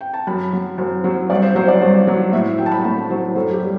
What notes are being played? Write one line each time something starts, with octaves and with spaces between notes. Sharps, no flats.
G5
A5
F#2 B5
F#3
F#2 C5
F#3 C5
G2 D5
C5
F#3 C5
D5
G2
F#3
A2 E5
F#3 G5
A5
B5
A2 A5
F#3 C5
F#2 A4
G4
G3